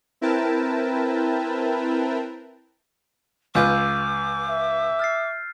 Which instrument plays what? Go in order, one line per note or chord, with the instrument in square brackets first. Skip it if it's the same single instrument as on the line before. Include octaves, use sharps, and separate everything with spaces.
[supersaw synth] C4 E4 A#4 B4 G5 A5
[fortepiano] C#2 F4 B4 [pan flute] D6 [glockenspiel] E6 G6 D#7
[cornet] E5
[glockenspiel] F6 A6 C7